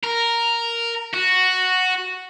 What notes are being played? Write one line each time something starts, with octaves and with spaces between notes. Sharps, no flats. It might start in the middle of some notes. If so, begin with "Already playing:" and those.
A#4
F#4